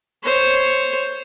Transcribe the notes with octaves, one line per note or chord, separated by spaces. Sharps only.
C5 C#5